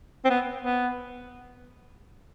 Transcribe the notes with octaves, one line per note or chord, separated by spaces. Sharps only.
C4
B3
B3